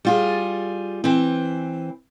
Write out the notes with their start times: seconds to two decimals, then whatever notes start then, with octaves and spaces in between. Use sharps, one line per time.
0.05 G3 F4 G#4
1.04 E3 C4